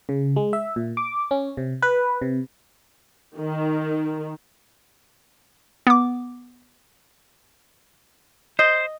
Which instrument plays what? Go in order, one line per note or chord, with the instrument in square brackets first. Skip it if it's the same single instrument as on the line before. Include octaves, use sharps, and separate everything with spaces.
[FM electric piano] C#3
G#3
E5
A#2
D6
C#4
C3
B4
C3
[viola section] D#3
[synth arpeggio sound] B3 D6
[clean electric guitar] C5 [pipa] D#5